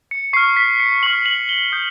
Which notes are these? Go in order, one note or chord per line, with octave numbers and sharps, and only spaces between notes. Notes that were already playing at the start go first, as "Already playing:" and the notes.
C#7
C#6 F6 C7
B6
C#7
C#6 F6 F#7
F#7
G7
D#6 G6